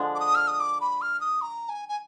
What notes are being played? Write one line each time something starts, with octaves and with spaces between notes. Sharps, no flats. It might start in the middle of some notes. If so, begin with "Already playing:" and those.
Already playing: D3 F3 G#3 D4
D6
D#6
F6
D#6
D6
B5
F6
D#6
A#5
G#5
G#5